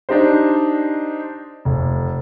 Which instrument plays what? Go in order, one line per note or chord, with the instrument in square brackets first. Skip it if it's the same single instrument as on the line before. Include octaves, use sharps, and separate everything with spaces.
[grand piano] D4 D#4 G4 C5
F1